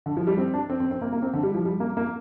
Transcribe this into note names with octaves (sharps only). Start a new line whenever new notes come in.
D3
F3
G3
C4
D4
C4
C4
C4
A#3
A#3
C4
D3
G3
F3
G3
A#3
A#3